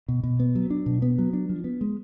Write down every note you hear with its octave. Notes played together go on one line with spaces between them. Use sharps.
B2
B2
B3
F#3
D4
B2
B3
F#3
D4
F3
B3
G#3